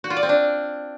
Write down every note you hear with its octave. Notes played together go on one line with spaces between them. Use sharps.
F#4
F4
D5
C4
D4